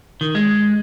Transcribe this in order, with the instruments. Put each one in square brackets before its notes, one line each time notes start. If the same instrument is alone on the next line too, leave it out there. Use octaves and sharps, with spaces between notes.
[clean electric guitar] D#3
G#3